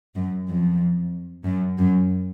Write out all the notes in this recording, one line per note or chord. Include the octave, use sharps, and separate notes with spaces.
F#2
F2
F#2
F#2